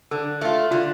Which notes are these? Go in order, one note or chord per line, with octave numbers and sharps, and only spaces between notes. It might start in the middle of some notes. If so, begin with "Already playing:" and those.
D3 A4
A3 F4 A4
D3 F4